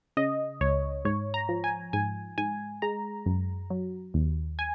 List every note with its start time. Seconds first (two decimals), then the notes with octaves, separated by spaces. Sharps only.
0.17 C#3 D#5
0.61 C#2 C#5
1.05 G#2 C#5
1.34 A#5
1.49 F3
1.64 G#5
1.93 G#2 G#5
2.38 G#2 G#5
2.82 G#3 A#5
3.26 F#2
3.70 F#3
4.14 D#2
4.59 G#5